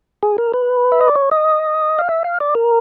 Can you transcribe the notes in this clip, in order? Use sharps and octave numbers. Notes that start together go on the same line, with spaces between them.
G#4
A#4
B4
E5
D#5
D5
C#5
D#5
F5
E5
F5
D5
A#4